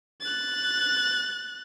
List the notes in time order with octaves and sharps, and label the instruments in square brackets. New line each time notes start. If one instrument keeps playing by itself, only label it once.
[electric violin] F#6 A6